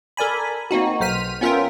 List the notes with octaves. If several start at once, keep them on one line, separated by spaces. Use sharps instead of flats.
A4 A#4 D5 G#5 B5
A#3 C4 D#4 F#4
B1 C5 F6 B6 D#7
B3 C#4 F4 A#4 E5 G5